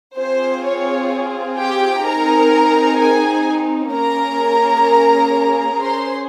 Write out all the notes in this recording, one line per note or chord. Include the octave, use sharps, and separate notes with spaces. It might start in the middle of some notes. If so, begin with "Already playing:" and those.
C4 F4 G#4 C5
C#5
G4 G5
C4 D#4 G#4 A#4 A#5
G#4 G#5
A#3 C#4 G#4 A#4 A#5
C#4 G#4 C5 C6